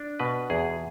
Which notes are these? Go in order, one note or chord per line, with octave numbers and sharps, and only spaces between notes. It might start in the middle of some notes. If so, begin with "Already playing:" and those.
Already playing: D4
B2 B4
E2 G#4